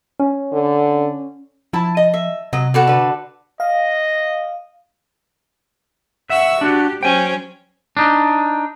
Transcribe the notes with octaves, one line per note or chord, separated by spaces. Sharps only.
C#4
D3
F3 E4 A5
D#5
E5
C3 F#3 D#5
B2 F#4 A4 D5
D3 B4
D#5 F5
E5 F#5 C#6 E6
D4 F#4 G4
F#3 C#4 C5 G5 G#5
D4 D#4